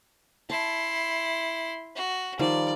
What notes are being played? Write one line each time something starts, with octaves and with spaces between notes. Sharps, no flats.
E4 A5 C6
F#4
D#3 F3 G3 D5